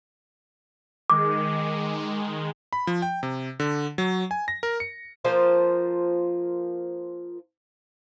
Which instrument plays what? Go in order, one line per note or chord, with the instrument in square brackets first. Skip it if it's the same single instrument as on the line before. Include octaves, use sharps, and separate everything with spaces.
[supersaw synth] D#3 G#3 [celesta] D6
[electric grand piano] B5
F3
G5
C3
D3
F#3
G#5
A#6
A#4
C#7
[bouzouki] F3 A#3 F4 C5